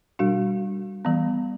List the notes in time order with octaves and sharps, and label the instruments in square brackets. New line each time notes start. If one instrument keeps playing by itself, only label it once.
[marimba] B2 G3 D4 F#4
E3 G3 B3